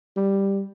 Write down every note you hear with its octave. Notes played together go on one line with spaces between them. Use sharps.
G3